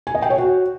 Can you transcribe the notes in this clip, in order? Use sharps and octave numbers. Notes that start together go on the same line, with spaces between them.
G#5
D#5
G5
C#5
F#4